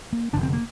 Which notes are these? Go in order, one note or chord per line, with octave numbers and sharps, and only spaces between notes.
A#3
F1 D#2 D3 D4
C4
A#3